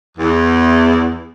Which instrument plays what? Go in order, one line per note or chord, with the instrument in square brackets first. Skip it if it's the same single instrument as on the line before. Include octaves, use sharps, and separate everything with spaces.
[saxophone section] E2